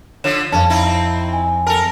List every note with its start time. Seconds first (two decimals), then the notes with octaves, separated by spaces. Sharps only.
0.24 D3 F3 C#5 E7
0.52 F2 C#4 F5 A5
0.70 C4 D#4 E4
1.33 G#5
1.67 A4 A#4 A5 F7